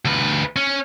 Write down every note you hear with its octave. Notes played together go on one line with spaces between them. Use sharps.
D2 B4
C#4